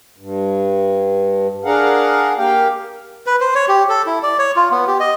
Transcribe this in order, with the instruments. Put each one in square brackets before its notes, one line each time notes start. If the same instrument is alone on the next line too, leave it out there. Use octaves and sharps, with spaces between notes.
[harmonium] G2
D4 G#4 A#4 F5 F#5
A#3 G4 F5 G5
[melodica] B4
C5
C#5
G4
A4
E4
D5
C#5
F4
B3
G4
D#5